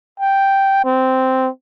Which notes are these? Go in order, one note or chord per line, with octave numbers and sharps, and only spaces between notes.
G5
C4